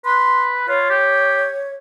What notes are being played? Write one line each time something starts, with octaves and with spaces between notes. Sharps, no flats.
B4 C6
F4 C#5
G4